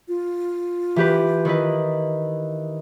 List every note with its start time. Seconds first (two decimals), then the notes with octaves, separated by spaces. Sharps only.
0.08 F4
0.96 E3 G4 B4
1.45 D#3 E4 B4